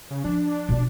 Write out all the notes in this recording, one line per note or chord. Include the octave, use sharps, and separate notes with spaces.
C#3
F3 D4
B2 F4